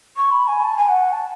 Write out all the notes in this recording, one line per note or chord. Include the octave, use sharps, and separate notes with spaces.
C#6
B5
G#5
A5
G#5
F#5
A5